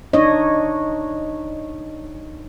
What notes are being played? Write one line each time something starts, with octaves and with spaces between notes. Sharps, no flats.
D4 D#4 C#5 D#5